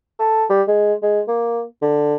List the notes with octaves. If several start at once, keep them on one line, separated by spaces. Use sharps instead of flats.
A4
G3
G#3
G#3
A#3
D3